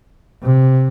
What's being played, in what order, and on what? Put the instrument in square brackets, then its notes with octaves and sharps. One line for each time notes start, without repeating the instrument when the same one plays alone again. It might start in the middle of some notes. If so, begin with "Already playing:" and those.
[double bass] C3